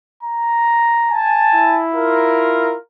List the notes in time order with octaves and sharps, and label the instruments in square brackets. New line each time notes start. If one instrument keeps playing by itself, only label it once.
[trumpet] A#5
[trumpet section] G#5 A5
[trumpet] E4
[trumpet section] F4 A#4